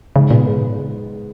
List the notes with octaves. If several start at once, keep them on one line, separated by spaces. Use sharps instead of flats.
G#2 C#3
A#2 B3
G#2 G#3